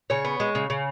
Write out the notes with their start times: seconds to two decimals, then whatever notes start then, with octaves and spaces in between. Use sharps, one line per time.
0.10 C#3 C#5
0.25 B3
0.40 G#3
0.55 C#3
0.70 C#3